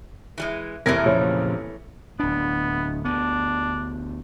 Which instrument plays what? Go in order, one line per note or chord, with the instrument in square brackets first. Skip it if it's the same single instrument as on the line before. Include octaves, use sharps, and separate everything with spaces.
[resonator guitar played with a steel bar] E3 G3 G#3
[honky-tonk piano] F1 C3 G#6 [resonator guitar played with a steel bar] E3 A3 A#4 [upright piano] A#6
[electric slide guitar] A#2 C#3 F3 [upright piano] C#5
[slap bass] D1 D4 [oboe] B3
[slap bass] D2 B3 [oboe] D4